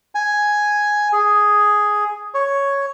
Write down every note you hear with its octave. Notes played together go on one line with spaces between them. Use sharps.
G#5
G#4
C#5